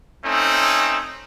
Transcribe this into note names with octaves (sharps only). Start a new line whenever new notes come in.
A3 C4 C#4 D#4